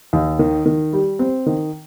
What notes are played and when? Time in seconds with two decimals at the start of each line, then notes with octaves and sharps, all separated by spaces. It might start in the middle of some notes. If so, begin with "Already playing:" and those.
0.13 D#2
0.39 D#3
0.66 D#3
0.93 G3
1.19 C4
1.46 D#3